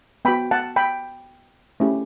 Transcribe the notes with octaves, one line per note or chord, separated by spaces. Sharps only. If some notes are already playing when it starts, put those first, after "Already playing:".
B3 F#4 G5 B5
F#5 A5
G5 B5
A3 C#4 E4 G4